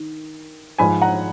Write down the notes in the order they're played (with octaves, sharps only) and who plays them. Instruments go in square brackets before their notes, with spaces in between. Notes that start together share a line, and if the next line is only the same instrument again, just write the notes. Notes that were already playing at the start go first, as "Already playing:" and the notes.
Already playing: [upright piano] D#3
G#2 F3 G#5 B5
F#5 A#5